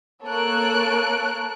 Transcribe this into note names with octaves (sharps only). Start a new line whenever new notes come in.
A#3 A4 C#5 F#6 D7